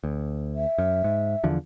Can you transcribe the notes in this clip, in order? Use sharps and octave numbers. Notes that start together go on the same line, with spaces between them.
D2
E5
F#2
G#2
E2 D3 F3